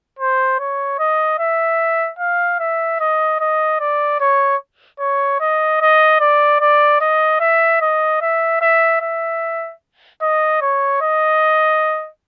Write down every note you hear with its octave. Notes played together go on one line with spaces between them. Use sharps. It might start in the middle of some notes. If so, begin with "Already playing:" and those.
C5
C#5
D#5
E5
F5
E5
D#5
D#5
D5
C#5
C#5
D#5
D#5
D5
D5
D#5
E5
D#5
E5
E5
E5
D#5
C#5
D#5